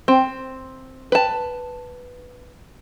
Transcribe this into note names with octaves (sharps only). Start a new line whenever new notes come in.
C4
B4 A5